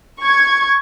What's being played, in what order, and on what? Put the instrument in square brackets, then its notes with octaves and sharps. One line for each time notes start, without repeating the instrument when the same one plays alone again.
[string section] C#6 G#6